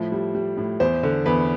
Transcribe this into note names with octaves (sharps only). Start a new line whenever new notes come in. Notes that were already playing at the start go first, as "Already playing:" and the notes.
Already playing: A2 F3
G3
G3
A2
E2 C5
D3
E2 B4